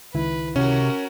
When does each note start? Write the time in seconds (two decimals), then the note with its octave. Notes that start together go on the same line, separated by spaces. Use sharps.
0.14 C#2 D#3 E4 B4
0.56 C3 C#4 F#4 A#4